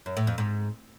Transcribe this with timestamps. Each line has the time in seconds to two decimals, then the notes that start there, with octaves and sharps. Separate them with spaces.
0.06 F#2
0.17 A2
0.27 F2
0.38 G#2